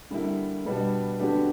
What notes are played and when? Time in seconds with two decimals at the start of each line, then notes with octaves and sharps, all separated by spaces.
0.10 D3 G3 A#3 E4
0.65 B2 G3 B3 D4
1.20 D3 F#3 B3 D4 G4